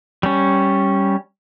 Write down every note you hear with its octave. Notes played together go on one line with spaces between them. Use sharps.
G3 C#4